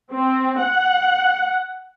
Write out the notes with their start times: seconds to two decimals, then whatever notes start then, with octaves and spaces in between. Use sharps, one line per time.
0.13 C4
0.61 F#5